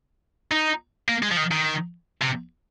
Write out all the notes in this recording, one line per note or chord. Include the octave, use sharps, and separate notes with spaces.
D#4
A#3
G#3
F3
D#3
D#3
C3